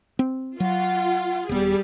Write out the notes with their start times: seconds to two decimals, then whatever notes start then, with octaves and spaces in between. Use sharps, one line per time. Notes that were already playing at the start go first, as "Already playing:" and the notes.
0.19 C4
0.60 F#3 F4 F#5
1.49 D#1 G3 B3 G#4